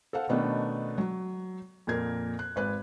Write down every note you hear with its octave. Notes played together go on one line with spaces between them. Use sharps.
A4 C5 F5 F#5
B2 D#3 A3 B3 C#4 D4
F#3
F2 A#2 A#4 G#6
F#6
G#1 B4 F#6